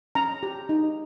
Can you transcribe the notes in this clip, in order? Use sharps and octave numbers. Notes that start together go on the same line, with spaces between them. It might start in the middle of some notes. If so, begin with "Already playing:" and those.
C#4 A#5
G4
D#4